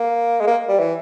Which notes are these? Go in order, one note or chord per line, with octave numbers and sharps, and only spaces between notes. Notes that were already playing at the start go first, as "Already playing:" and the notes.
Already playing: A#3
G#3
A#3
G3
E3